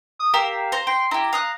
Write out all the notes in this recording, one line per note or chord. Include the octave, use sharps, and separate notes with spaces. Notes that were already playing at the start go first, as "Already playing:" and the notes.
D#6
G4 A#4 F5 E6
C5 A#5
G5 C6
E4 G4 A#5
F5 D#6 F#6